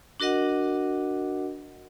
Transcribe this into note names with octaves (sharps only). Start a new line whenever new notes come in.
D4 F#4 A#4 D#5 F#5